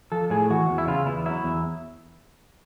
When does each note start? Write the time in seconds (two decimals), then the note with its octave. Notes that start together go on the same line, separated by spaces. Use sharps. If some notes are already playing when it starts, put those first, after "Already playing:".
0.12 F3 A4
0.30 A2 G#4
0.50 E3 F#4
0.69 E2
0.78 E4
0.87 C#3 F4
1.06 E2 E4
1.25 F#3 E4
1.44 E2